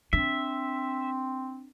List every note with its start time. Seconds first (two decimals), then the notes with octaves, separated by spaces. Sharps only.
0.13 C4 D4 E5